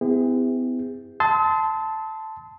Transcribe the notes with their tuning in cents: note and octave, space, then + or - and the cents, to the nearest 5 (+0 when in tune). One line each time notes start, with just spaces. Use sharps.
B3 +45 E4 +0 G#4 -45
A5 +0 C6 -15 D#6 +45